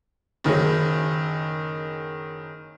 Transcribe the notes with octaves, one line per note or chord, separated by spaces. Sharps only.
F#1 D#3 F#3 G#4